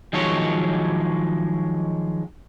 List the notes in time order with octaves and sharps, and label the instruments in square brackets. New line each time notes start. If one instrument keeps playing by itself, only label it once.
[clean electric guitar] D#3 F3 F#3 G#3 C#5